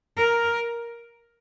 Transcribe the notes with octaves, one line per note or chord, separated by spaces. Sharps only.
A#4